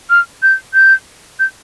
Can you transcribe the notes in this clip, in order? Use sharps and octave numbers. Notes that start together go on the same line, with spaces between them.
F6
G6
G6
G6